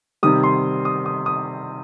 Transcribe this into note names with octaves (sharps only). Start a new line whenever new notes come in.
C3 D#3 G3 D#6
C6
D#6
D#6
D#6